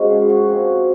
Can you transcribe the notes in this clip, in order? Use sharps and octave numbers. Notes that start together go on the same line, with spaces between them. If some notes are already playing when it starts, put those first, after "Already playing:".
Already playing: C#3 F3 G#3 C#4 F#4 A#4 D#5
G#4
F#4
C3 F3 A#3